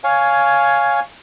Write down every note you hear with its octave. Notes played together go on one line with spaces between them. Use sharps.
C#5 F5 G#5